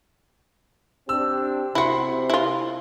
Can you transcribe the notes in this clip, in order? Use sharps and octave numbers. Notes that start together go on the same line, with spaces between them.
C4 D4 G4 E6
C3 E4 F#4 B5 C6
E4 F4